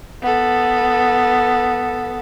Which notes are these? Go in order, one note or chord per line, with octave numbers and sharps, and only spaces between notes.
B3 A4